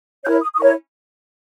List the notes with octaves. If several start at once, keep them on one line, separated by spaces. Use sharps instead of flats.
E4 A#4 C#5 G6
D#6
D#6
E4 A#4 C#5 C#6